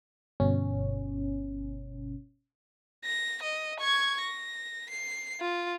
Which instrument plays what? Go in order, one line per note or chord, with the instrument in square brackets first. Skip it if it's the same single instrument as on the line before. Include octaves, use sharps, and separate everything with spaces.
[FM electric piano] G1 B2 C#4
[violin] A#6
D#5
C#6 G#6
A#6
C7
F4